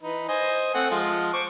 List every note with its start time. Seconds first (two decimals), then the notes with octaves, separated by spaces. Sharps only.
0.02 E3 D#4 B4
0.29 C5 D#5 G#5
0.74 A3 C4 F#5
0.91 F3 G#3 F4
1.33 C5 C#6 D6